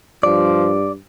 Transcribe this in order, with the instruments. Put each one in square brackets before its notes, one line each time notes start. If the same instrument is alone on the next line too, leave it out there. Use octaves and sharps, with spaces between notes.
[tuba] G2 [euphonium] F3 [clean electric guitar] D5